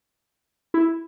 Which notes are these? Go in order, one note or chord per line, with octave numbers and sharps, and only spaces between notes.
E4